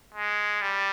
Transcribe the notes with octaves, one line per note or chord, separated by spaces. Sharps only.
G#3
G3